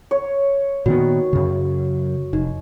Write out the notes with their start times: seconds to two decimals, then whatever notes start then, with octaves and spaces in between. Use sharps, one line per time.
0.11 C#5
0.86 A#2 D#3 B3 F#4
1.33 F#2 C#3
2.33 F1 D#4